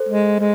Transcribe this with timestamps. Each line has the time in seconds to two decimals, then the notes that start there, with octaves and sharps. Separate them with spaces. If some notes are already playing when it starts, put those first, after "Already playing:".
Already playing: A4 C5
0.09 G#3
0.39 G#3